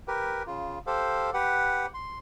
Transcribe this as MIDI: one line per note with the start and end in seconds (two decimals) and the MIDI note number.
0.08 0.43 67
0.08 0.43 70
0.08 0.43 71
0.47 0.79 49
0.47 0.79 65
0.87 1.30 67
0.87 1.30 69
0.87 1.30 72
0.87 1.30 77
1.34 1.86 67
1.34 1.86 71
1.34 1.86 78
1.94 2.19 84